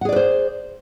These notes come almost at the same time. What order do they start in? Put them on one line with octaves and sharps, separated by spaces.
F#5 G#4 D5 B4 C5